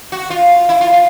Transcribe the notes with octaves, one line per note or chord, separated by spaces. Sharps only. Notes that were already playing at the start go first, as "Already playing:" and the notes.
F#4
F4
E4
F4
F4